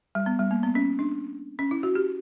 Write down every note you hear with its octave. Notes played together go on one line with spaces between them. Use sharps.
G3
B3
G3
A#3
B3
C#4
D4
C#4
E4
F#4
G4